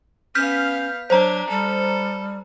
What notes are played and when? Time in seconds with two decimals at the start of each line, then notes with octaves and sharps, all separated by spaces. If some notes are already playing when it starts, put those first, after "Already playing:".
0.35 B3 C#4 F5 F6 G6 B6
1.10 F#3 D4 C5 A#5
1.49 G3 A4